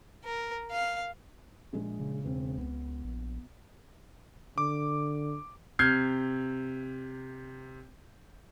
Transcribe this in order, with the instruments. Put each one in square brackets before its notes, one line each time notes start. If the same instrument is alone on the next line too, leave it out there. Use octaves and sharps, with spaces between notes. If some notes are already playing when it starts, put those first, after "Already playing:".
[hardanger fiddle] A#4
F5
[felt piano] A#1 G#3 G#4
[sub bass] C#3
[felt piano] E1 C4
[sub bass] C#2 [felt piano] B3
[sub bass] A#1
[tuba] D3 [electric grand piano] D6
[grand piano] C3 F6 G6 G#6 C7